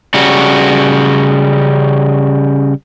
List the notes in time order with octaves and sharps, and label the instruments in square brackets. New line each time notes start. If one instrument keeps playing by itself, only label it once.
[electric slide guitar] C#3 G3 F#4